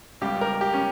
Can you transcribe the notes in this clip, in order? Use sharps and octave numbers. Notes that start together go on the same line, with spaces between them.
C#2 C#3 G3 G4
A#4
G4
C#4